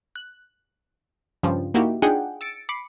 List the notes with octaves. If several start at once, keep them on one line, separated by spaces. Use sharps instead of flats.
F#6
G2 C#3 F3 G3
A#3 D#4 E4 F#4 G4
D4 D#4 F4 G#4 F#5 G5
E6 A6 C#7 D7
B5 D6 C7 C#7